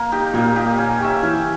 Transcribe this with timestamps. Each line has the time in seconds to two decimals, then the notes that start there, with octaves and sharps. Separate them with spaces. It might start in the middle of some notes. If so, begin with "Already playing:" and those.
Already playing: A#3
0.12 D#4 G4
0.34 A#2 A#3
0.56 D#4 G4
0.78 C#4
1.00 G4 C#5 E5
1.23 E3 C#4